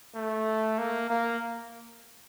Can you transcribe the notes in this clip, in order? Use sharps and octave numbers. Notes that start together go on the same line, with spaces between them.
A3
A#3
A#3